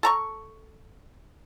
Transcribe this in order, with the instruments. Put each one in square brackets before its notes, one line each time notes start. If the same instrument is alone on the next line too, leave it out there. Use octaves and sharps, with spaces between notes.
[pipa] A4 A#5 C#6